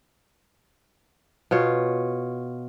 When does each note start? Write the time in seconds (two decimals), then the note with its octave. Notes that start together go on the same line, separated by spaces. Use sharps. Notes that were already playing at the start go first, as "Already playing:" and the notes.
1.51 B2 F4 C#5